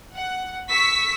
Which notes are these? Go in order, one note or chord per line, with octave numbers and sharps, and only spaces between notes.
F#5
C#6 E6 B6